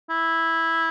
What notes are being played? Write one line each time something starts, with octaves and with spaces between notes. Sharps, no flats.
E4